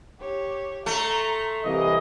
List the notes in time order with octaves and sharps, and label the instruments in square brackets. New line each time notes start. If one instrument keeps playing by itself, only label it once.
[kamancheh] G4 C#5
[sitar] A3 [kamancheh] A#5 C6
[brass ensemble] C2 E3 D#5 [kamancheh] A#3